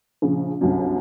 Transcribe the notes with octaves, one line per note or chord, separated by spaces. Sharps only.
A#1 C#3
G1 C2 F#2